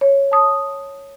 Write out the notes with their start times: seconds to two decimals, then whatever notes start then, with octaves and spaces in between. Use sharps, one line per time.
0.01 C#5
0.31 A5 D#6